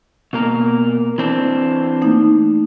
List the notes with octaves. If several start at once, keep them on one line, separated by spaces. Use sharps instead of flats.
B2 A#3 A#4
E3 C4 D4
A3 A#3 D#4